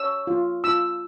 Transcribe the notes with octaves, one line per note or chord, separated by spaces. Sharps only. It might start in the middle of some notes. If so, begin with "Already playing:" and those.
Already playing: C#5 E6
F4
F4 E6